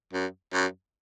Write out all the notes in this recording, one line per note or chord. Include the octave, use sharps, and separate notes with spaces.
F#2
F#2